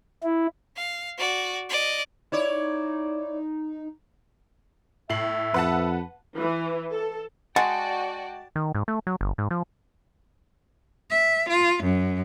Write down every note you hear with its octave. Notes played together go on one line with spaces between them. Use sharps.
E4
F5
F#4 D5
D5 D#5
D#4 E4 C#5 D5
A2 E5 C7 F#7
F2 B4 F#5 A5
E3
A4
G#3 F#4 D5 F#5 G5 A5
D#3
G#2
A3
F#3
G1
G#2
F3
E5
F4
F#2